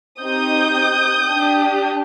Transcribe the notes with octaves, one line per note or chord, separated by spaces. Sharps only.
C4 D#4 G4 D#6 G6
D4 G4